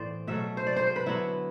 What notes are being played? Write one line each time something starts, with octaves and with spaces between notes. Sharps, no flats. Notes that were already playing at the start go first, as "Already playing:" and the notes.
Already playing: A2 E3 B3 C5 D5
B2 F#3 A3 E5
C5
D5
C5
C5
B4
D3 F#3 B3 E4